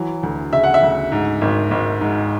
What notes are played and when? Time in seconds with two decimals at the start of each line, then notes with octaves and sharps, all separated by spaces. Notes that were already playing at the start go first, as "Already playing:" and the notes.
Already playing: E3 F#3
0.23 D2
0.52 C#3 E5
0.64 F#5
0.74 E5
0.82 D2
1.12 G#2
1.41 G#1
1.71 G#1
2.01 G#2